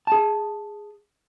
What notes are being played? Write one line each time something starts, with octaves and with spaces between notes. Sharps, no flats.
G#4 A5